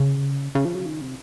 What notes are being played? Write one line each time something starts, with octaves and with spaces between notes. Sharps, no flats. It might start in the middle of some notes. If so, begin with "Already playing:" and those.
Already playing: C#3
C#3
F3
F#3
D#3
C3